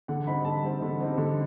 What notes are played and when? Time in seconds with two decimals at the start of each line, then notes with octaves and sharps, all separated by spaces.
0.08 D3 F#5
0.26 G3 C4 D#4 B5
0.45 D3 A5
0.63 G3 C4 D#4
0.82 D3
1.00 G3 C4 D#4
1.18 D3